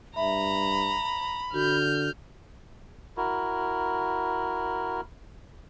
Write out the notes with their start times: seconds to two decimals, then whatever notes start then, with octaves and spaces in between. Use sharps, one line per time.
0.16 G2 E5 A#5 B5
1.54 D3 F#4 F6 G6
3.17 E4 F#4 A#4